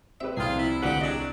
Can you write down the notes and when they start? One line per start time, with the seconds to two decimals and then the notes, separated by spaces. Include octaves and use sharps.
0.21 C4 G4 B4 E5
0.37 C2 F3 F4 G#4 G5 D#6
0.58 E4
0.83 D2 G2 D3 F4 G4 F#5
1.01 F#3 D4 G#4 D#5